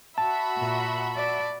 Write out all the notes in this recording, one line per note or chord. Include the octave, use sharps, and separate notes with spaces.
F#4 E5 A5 B5
A#2
D5